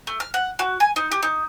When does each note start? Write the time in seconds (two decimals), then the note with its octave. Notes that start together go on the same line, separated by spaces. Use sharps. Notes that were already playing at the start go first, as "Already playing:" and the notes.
0.07 A3
0.20 F6
0.34 F#5
0.59 F#4
0.80 G#5
0.96 D#4
1.11 G4
1.23 D#4